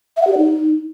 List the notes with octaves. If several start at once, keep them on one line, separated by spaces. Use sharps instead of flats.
E5
F#5
G4
D5
D#4